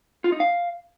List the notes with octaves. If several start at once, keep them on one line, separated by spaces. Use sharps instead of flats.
F4
D#4
F5